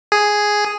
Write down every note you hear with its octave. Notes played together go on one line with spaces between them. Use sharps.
G#4